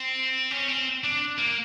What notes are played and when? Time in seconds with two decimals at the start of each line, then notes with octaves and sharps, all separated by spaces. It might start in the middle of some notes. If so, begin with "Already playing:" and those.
Already playing: C4
0.51 C#4
0.68 C4
1.04 D4
1.38 A#3